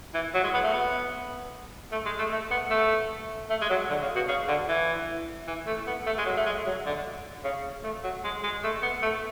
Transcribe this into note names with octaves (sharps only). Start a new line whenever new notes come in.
E3
F#3
G#3
B3
A3
B3
A3
G#3
A3
A3
B3
A3
A3
G#3
F#3
D3
C#3
B2
C#3
D3
E3
E3
A3
B3
A3
G#3
F#3
A3
G#3
F#3
D3
C#3
A3
F#3
G#3
G#3
A3
B3
A3